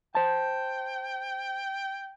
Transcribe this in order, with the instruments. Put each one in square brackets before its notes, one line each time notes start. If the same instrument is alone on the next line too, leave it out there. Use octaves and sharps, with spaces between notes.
[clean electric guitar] C5 A5 [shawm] G5